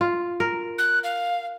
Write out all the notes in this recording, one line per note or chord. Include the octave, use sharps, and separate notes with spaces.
F4
A#4
F#6
F5